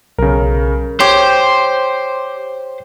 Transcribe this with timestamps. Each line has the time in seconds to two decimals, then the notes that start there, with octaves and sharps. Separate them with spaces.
0.19 B1 C#3 A#4
1.00 G4 C5 C#5 C6